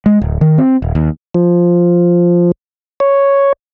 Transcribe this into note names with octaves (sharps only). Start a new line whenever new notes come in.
G#3
D1
D#3
C4
D#1
D#2
F3
C#5